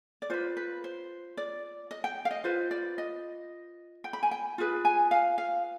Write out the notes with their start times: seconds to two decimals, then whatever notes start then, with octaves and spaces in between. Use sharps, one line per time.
0.22 D5
0.30 F4 B4 C5
0.57 B4
0.84 C5
1.37 D5
1.91 D#5
2.04 G5
2.25 F5
2.31 D#5
2.44 F4 B4 C5
2.71 D5
2.98 D#5
4.04 G5
4.13 B5
4.23 G#5
4.31 G5
4.58 F4 G#4 B4
4.85 G#5
5.11 F5
5.38 F5